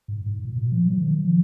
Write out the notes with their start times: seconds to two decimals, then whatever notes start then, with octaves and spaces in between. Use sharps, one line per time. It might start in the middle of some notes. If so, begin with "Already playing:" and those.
0.08 G#2
0.26 G#2
0.45 A#2
0.58 B2
0.72 F3
0.85 F#3
0.98 D#3
1.25 F3